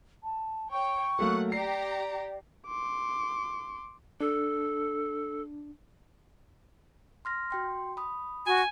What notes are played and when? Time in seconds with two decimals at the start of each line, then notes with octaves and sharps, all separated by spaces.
0.24 A5
0.71 C#5 G5 C#6
1.19 F#3 A3 A#3 F#5
1.52 G4 D5 A#5 C7
2.67 C6 D6
4.21 D4 A4
7.25 C6 F6 A#6
7.51 F#4 G5 C6
7.97 B5 D#6
8.47 F#4 G#5